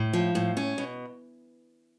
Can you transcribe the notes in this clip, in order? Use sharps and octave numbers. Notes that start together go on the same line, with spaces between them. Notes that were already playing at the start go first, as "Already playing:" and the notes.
Already playing: A2
F3
A2
C#4
B2